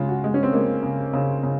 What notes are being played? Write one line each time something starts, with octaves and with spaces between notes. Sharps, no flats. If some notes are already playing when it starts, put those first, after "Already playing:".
Already playing: C#3 G#3 F4
F#4
G#3
C#4
C4
G#3 A#3
C#3
C#3
C#3